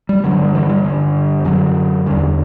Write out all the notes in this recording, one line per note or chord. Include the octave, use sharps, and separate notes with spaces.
G3
G2 D3 F#3
G3
E3
G3
G2 D3
F#2 D3 F#3
E2 D3 G3